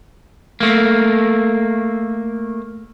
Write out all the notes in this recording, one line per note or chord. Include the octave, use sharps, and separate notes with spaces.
A3 A#3